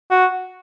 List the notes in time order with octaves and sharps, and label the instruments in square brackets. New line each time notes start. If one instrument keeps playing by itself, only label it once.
[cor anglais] F#4